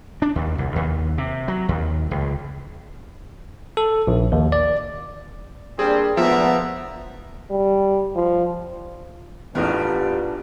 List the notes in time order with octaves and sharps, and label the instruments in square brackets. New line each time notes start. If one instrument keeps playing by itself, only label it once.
[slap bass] D4
D#2
C2
D#2
C3
F#3
D#2
C#2
[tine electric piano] A4
A#1
D#2
D5
[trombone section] G3 A#3 D4 [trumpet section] C4 [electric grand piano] G#4
[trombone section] G#1 D2 A#2 [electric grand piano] F3 [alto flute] B3 [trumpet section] E5 A#5
[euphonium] G3
F3
[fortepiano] A1 E2 [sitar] G3 A#4 [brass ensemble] B3 D4 F4